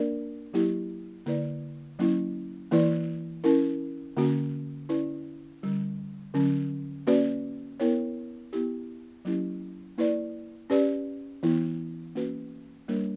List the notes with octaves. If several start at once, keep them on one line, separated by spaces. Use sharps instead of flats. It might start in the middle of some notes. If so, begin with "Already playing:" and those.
Already playing: A#3 D4 A#4 D5
F#3 A#3 E4 G4
D3 A#3 E4 B4 D5
F#3 A#3 C#4 E4
E3 A#3 E4 B4 D5
C#4 E4 A#4
D3 A#3 C#4 F#4
C#4 E4 B4 D5
D3 G3 C#4
D3 F#3 C#4
A#3 C#4 F#4 B4 D5
B3 E4 A#4 C#5
B3 E4 G4
F#3 A#3 C#4 E4 G4
A#3 E4 B4 D5
C#4 G4 B4 D5
E3 B3 E4
E3 A#3 C#4 F#4 B4
G3 A#3 D4 A#4 C#5